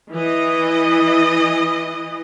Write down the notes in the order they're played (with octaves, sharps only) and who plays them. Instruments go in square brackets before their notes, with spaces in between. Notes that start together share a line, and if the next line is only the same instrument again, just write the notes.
[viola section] E3 D#5